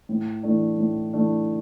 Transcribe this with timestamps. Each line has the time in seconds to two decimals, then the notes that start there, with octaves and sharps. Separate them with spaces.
0.09 A2
0.43 E3 A3 D4
0.78 A2
1.13 E3 A3 D4